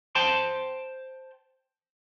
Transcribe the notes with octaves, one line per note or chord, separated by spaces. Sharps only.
C5 G5 A5 C6